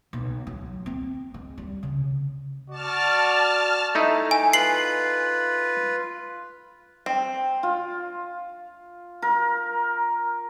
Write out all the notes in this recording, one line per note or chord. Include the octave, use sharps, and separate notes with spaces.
B1
F#3
C4
G#3
G3
C#3
F#4 D5 A5 F6
A3 D#4 E4
G#5
F4 B4 C7 F#7
C4
F4
A#4